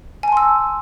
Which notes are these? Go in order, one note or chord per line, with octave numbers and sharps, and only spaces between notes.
G#5 A5 C6 E6